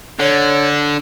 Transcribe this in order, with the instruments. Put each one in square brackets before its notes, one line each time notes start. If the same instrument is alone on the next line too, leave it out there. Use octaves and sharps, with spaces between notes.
[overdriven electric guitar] D3 [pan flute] C#5